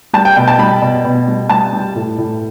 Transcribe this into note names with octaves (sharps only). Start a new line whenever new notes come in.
G3 A5
G5
B2 G5
A5
G3 B5
B2
B2
G3
G3 A5
G3
A2
A2